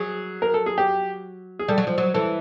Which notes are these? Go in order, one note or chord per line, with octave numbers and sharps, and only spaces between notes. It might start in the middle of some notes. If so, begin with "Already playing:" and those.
Already playing: F#3 G#4
A#4
A4
G#4
G4
G#4
G3 A4
F#3
F3
F#3
E3 A4